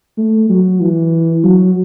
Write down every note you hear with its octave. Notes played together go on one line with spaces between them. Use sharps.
A3
F#3
E3
F#3